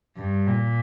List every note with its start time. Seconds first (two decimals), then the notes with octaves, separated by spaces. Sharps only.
0.16 G2
0.47 A#2